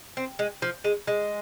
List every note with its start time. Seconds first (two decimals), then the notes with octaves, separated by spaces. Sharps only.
0.17 C4
0.39 G#3
0.62 F3
0.84 G#3
1.07 G#3